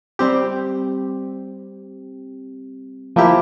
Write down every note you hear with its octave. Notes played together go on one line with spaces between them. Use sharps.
G3 C4 G4
F3 A#3 E4 G4